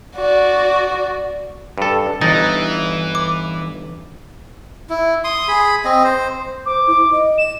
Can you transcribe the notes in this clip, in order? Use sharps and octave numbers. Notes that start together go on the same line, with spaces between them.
F#4 D5
G2 A4
G1 E3 D#4 A6
D6
E4
C6 D#6
G#4 B5
C4 D#5
C5
C5 D6
E4
D#5
E7